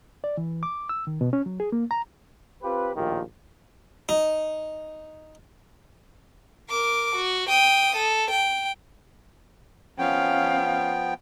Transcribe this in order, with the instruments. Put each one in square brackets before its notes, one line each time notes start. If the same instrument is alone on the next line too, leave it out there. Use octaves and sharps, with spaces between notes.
[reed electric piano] D5
E3
D6
E6
D#3
B2
C#4
F#3
G#4
A#3
A#5
[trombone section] C4 F4 G4 B4
A#1 D#2 A2 D#3 F4 G4
[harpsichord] D#4
[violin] A#4 D6
F#4
G5 D#6
A4
G5
[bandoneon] F3 B3 G5 [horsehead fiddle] C#4 F5